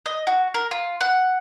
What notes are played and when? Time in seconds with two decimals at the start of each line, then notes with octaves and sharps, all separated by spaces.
0.06 D#5
0.27 F#4
0.54 A#4
0.71 F4
1.01 F#5